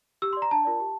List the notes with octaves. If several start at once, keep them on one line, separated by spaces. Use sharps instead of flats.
G4 E6
C6
D5
A#5
D4 A5
F4 A#4 D5
G4